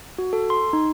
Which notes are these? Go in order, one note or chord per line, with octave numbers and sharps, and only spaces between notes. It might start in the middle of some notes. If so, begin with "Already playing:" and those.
F#4
A4
C6
D#4